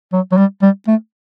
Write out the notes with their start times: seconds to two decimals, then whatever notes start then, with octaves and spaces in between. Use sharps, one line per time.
0.13 F#3
0.32 F#3
0.37 G3
0.62 G3
0.87 A3